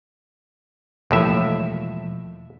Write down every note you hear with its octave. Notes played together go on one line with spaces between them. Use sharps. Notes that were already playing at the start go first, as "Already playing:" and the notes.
E1 D#2 A2 F3 E5